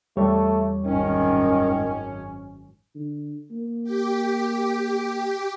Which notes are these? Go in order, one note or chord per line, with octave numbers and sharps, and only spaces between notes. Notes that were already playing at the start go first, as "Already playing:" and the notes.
E2 G3 A3 C#5
G#1 F#2 D#3 C#4
D3
A#3
G4